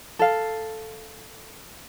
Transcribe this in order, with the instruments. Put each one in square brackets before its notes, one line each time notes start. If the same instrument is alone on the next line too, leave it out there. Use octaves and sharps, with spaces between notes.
[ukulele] A4 F5